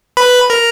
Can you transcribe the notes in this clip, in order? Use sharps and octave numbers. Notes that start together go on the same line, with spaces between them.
B4 B5
A#4 A#5